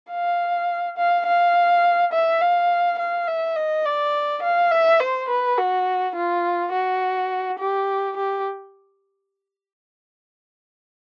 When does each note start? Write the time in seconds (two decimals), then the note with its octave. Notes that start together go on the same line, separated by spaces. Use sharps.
0.11 F5
0.98 F5
1.26 F5
2.13 E5
2.41 F5
2.99 F5
3.28 E5
3.56 D#5
3.85 D5
4.43 F5
4.72 E5
5.00 C5
5.29 B4
5.58 F#4
6.16 F4
6.73 F#4
7.59 G4
8.17 G4